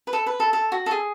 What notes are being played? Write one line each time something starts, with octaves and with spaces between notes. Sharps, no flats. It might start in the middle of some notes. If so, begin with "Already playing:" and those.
B4
A4
B4
A4
A4
F#4
A4
G#4